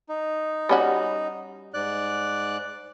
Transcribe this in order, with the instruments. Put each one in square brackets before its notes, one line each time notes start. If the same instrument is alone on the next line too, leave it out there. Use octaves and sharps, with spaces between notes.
[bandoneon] D#4
[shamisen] G3 C#4 F#4
[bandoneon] G#2 D5 F#6